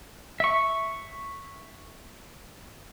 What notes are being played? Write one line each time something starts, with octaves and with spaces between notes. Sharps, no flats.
E5 C#6